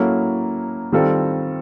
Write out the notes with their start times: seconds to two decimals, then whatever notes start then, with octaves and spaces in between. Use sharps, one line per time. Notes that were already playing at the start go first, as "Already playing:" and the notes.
Already playing: F#3 A#3 C#4 E4 A4
0.92 D#3 G3 C4 F4 A4